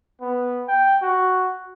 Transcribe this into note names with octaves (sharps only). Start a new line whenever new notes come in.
B3
G5
F#4